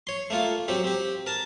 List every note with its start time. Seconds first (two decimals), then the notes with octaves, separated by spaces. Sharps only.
0.07 C#5 C6
0.30 A3 A#3 F4
0.68 F#3 C4 G4
0.84 C4 G4
1.26 A#4 A5